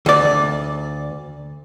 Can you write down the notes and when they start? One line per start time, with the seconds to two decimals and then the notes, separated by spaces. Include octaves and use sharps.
0.06 D2 D5